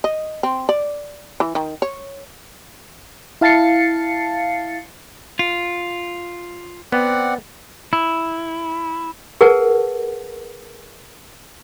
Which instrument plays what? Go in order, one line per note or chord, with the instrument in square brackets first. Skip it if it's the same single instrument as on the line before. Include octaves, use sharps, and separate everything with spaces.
[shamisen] D#5
C4
D5
E3
D#3
C#5
[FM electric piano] E4 F5 A5 A6 C7 C#7
[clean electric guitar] F4
[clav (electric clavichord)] B3 [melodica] C4 D5 F#5
[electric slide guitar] E4
[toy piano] G#4 A#4 B4 F#5 A5